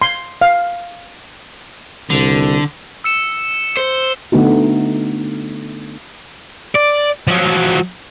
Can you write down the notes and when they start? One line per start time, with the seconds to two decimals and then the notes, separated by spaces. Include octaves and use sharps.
0.02 C6
0.41 F5
2.10 C2 D3
3.04 E6 C#7 E7
3.77 C5
4.32 D3 A3 B3 D#4 F#4
6.75 D5
7.27 F3 F#3